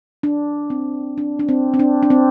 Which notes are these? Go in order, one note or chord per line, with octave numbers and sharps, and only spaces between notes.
D4
C4
D4
D4
C4
C4
D4
D4
C4